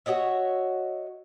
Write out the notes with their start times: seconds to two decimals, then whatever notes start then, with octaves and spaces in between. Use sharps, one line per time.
0.06 F#4 C#5 D#5 E5